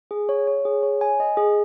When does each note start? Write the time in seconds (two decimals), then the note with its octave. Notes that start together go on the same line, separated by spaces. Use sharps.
0.11 G#4
0.29 C#5
0.47 C#5
0.65 G#4
0.83 C#5
1.01 G#5
1.20 D#5
1.37 G#4